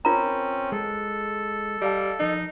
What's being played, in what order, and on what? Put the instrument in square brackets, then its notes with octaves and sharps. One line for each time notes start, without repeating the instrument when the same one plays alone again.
[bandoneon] C4 C#4 [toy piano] F4 A#4 A#5
[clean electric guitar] G#3 [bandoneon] A4
[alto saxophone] G3 [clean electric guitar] D#5 F5 A5
[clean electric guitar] F3 A#4 [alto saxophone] D#4